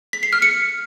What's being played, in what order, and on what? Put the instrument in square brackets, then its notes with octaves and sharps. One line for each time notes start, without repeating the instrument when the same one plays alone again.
[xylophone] B6
C7
F6
C#7